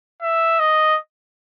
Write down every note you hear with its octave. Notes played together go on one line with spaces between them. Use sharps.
E5
D#5